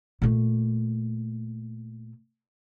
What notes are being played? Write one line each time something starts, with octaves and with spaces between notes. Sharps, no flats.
A#2 A3